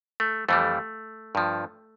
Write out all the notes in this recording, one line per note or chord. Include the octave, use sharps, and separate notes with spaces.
A3
F2 E3 G3 A3
G2 F3